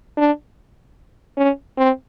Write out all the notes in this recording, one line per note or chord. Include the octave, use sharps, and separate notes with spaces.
D4
C#4
C4